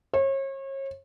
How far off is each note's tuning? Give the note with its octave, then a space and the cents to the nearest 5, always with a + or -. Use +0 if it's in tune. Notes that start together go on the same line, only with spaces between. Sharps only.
C#5 -35